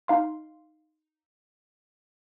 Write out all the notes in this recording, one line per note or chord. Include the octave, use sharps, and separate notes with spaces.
D#4 F5 C6